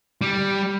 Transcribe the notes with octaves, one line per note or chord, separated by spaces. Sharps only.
G3